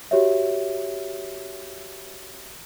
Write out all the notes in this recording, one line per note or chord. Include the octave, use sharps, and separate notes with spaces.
F#4 G4 C#5 E5